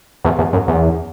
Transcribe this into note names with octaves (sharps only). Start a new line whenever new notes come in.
E2
E2
F#2
E2